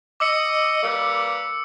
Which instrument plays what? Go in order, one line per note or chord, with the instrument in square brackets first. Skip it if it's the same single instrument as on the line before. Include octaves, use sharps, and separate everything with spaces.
[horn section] D#5 [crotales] D6 E6 C#7
[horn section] G3 A#3 B4